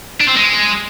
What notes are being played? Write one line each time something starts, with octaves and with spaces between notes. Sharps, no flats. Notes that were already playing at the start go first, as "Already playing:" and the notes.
D4
C4
G#3